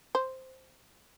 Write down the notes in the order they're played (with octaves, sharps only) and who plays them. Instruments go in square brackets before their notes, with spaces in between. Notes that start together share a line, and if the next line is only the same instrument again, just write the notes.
[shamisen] C5